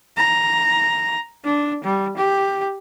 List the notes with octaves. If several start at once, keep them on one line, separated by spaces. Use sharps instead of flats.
A#5
D4
G3
G4